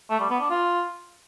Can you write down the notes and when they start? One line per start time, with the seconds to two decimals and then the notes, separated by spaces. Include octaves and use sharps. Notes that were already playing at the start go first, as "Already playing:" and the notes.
0.10 A3
0.20 G3
0.30 B3
0.40 D4
0.50 F4